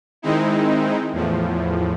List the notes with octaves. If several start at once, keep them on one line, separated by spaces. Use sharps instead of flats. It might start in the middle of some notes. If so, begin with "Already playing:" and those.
D#3 G#3 C4 D#4 E4
E2 A2 F3